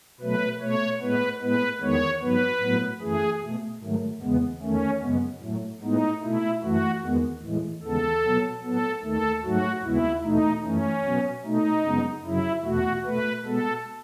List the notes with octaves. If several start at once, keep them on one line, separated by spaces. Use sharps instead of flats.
B2 F#3 A3 B4
B2 A3 C#5
A2 G#3 B3 B4
A2 G#3 B3 B4
E2 D#3 G#3 B3 C#5
G#2 F#3 B3 B4
A2 F#3 B3
F#2 E3 A3 G#4
B2 A3
G#2 D#3 F#3 A3
E2 C#3 G#3 B3
E2 D#3 A3 C#4
F#2 C#3 G#3 B3
A2 F#3 A3
A2 G#3 B3 D#4
B2 A3 E4
F#2 E3 A3 F#4
E2 D#3 G#3 B3
A2 E3 G#3
D#2 C#3 E3 G#3 B3 A4
B2 F#3 B3
A2 F#3 B3 A4
D#2 D#3 A3 A4
G#2 F#3 A3 F#4
D#2 C#3 G#3 B3 E4
E2 B2 A3 D#4
F#2 E3 A3 C#4
B2 F#3 B3
B2 A3 D#4
F#2 C#3 G#3 B3
F#2 C#3 F#3 E4
E2 B2 A3 F#4
B2 A3 B4
B2 G#3 B3 A4